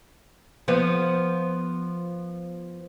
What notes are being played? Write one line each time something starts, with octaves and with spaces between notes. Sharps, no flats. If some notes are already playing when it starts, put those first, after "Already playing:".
F3 B3